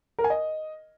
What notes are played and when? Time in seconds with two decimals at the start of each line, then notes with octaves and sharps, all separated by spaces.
0.19 A#4
0.24 G#5
0.30 D#5